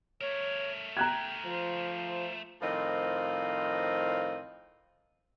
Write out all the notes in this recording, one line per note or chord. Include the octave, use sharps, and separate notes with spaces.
A3 A#4 C#5
G5 A#5 F#6 G#6
F3 C5
A2 D#3 F3 C4 D#5 F5